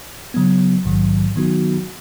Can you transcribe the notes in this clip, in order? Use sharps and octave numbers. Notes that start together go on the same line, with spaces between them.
C#3 F#3 B3
A#1 G#2 D#3 F#3
D#3 F#3 B3 D#4 F#4